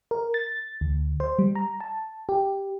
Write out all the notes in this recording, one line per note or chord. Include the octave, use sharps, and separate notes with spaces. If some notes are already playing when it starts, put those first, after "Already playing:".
A#4
A6
D2
C5
G3
A#5
A5
G4